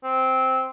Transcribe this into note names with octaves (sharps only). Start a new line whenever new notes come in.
C4